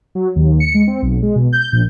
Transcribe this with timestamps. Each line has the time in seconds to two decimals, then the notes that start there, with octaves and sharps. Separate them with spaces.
0.15 F#3
0.36 D#2
0.60 C#7
0.74 G#3
0.87 C4
1.02 B1
1.22 G#3
1.35 B2
1.53 G6
1.72 A#1